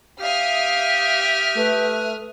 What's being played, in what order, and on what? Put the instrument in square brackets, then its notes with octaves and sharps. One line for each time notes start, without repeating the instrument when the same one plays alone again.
[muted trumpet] G4 [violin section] E5 D#6 F6 [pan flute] F5
[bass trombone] A3 [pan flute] B4